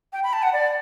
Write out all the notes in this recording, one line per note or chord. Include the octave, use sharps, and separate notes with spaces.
G5
B5
A5
F#5
D5